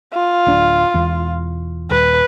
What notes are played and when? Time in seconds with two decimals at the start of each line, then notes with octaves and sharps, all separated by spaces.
0.14 F4
0.46 D1 D4
0.94 E1 E2
1.91 D#1 B4